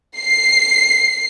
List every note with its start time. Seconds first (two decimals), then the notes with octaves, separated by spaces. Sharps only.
0.17 C7